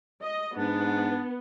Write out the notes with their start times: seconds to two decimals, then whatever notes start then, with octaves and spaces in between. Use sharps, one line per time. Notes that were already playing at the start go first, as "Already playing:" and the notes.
0.23 D#5
0.57 G#2 B3 D4